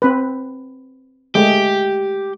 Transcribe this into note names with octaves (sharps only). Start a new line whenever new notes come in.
C4 B4
G#3 A3 G4